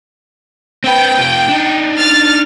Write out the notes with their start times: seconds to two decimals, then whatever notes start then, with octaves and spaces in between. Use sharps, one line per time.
0.84 C4 B4 G5
1.18 C3 F4
1.49 D4 D#4
1.97 F6 A6